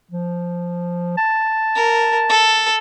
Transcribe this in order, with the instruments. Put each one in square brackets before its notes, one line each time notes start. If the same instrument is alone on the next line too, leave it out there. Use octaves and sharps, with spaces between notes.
[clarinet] F3
A5
[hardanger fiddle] A#4
A4